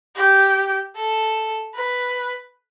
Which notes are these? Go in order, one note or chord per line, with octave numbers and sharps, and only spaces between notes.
G4
A4
B4